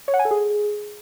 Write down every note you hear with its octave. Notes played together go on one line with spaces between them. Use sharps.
C#5
F#5
G#5
A4
G#4